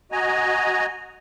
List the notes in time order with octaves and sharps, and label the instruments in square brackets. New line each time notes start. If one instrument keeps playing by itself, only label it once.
[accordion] F#4 D#5 G#5 A#5